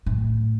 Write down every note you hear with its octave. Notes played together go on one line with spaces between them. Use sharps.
A2